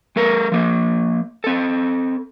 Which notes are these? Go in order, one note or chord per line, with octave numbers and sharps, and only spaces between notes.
G#3 A4 A#4
F3 A#3
C4 A4